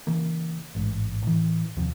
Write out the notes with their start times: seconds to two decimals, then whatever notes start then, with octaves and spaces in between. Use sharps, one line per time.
0.07 C#3 E3 A#3
0.75 A1 G#2
1.24 A2 E3
1.76 D#2 C3 F3